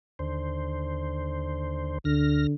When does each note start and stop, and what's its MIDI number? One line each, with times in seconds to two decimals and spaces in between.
0.19 1.98 39
0.19 1.98 50
0.19 1.98 72
2.05 2.47 38
2.05 2.54 50
2.05 2.47 89
2.05 2.47 94